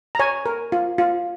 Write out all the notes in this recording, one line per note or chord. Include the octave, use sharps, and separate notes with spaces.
A#5
C#5 G#5
A#4
F4
F4